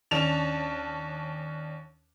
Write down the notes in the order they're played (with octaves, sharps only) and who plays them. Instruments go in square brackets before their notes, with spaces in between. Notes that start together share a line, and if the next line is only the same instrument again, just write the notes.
[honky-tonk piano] D#2 C#4 D4 A5 E7 F7